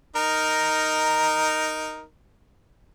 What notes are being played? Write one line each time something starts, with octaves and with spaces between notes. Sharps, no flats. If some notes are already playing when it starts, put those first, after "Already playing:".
D#4 A#4